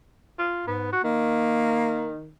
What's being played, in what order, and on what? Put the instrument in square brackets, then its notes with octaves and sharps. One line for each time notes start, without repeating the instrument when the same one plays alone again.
[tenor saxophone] F4
[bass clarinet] G#2 [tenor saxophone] B3
[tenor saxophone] F#4
[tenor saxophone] D#3 [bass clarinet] A#3